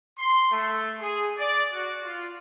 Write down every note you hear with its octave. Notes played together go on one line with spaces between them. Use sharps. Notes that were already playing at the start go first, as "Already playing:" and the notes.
C6
A3
G#4
D5
F#4
F4